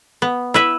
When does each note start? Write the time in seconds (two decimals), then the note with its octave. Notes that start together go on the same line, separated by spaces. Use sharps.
0.22 B3
0.54 E4 B4 E5